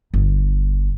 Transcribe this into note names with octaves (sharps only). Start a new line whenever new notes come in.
G1